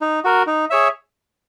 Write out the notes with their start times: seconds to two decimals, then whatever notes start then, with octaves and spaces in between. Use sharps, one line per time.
0.01 D#4
0.24 F#4 A#4
0.47 D#4
0.70 G#4 C#5 E5